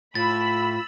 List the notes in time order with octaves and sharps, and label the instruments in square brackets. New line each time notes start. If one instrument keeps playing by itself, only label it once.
[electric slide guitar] A2 [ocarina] F4 [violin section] B5 E6 [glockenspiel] A6